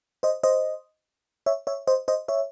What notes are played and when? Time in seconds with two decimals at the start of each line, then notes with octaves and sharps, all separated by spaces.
0.23 C5 D#5
0.43 C5 D#5
1.46 C#5 E5
1.67 C#5 E5
1.87 C5 D#5
2.08 C5 D#5
2.28 C#5 E5